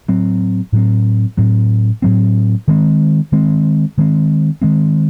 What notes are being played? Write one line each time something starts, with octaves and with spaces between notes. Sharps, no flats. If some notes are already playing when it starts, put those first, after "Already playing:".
A2 F#3 C4
A2 F#3 C4
A2 F#3 C4
A2 F#3 C4
D#3 G#3 C4
D#3 G#3 C4
D#3 G#3 C4
D#3 G#3 C4